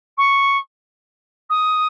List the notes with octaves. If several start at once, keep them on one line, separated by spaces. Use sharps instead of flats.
C#6
D#6